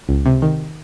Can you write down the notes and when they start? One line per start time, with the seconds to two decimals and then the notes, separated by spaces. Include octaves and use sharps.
0.09 C#2
0.26 C3
0.42 D#3